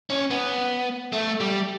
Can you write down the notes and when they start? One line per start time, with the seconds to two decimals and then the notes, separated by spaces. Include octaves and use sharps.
0.10 C#4
0.30 B3
1.13 A3
1.40 G3